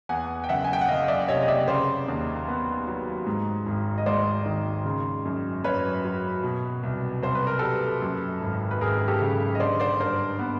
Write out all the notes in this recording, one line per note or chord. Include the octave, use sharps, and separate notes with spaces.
E2 F#5 G#5
G5
F#1 E5 F#5
G#5
G5
F#5
F#1 D#5 F5
D5 E5
C3 C#5 D#5
D#5
D5 E5
C#3 C5 D5
D#2
B3
F#3
G#2
G#1
D#5
G#3 C5 D5
D#3
C#3
F#2
F#2 B4 C#5
F#3
B2
C2
C2 C5
B4
A#4
G3 A4 B4
F#2
G#1
B4
G#1 G#4 A#4
G4 A4
C#3
D#5
D3 C5 D5
C5 D5
G2 A#4 C5
B3